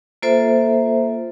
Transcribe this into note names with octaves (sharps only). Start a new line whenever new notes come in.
A#3 F4 A4 C5 E5